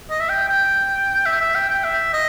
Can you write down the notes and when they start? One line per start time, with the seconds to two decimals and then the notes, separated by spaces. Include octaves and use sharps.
0.10 D#5
0.20 E5
0.29 G5
0.48 G5
1.26 E5
1.41 E5
1.55 G5
1.70 G5
1.84 E5
2.13 D#5